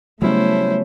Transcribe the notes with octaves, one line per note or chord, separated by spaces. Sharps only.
C#3 F#3 G3 A3 B3 C#4 E4 C5